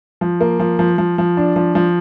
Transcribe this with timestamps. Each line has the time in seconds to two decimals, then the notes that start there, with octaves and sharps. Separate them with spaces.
0.21 F3
0.41 A#3
0.59 F3
0.79 F3
0.98 F3
1.18 F3
1.37 D4
1.56 F3
1.75 F3